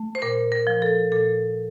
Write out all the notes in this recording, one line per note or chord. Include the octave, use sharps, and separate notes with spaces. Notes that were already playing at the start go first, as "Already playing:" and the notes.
Already playing: A3
C5
A#2 A#4
A#4
F3
A4
A#2 A4